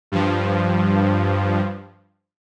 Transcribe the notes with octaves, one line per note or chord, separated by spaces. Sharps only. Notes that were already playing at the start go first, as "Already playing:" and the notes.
G2 F3